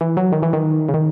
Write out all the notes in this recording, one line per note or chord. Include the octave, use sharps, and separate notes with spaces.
E3
F#3
D#3
E3
D#3
C#3
D#3